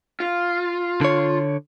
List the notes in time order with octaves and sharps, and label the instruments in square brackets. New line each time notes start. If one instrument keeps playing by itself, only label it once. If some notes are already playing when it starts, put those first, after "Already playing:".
[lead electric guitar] F4
[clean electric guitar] D3 C#5